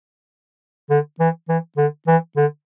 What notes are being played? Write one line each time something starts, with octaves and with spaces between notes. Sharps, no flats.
D3
E3
E3
D3
E3
D3